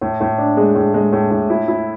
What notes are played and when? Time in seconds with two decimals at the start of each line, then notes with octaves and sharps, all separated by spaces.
0.02 A2
0.21 A2
0.38 D4
0.57 G#3
0.75 A2
0.94 G#3
1.13 A2
1.31 A2
1.50 E4
1.68 E4